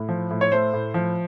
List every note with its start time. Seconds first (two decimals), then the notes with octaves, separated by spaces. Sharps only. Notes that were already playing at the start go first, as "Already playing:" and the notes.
Already playing: A2
0.09 F3
0.30 A2
0.41 C#5
0.52 A3 C5
0.73 A2
0.94 F3